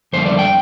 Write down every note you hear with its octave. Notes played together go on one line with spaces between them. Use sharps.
F2 D3 G3 A#3 C5
D5
G5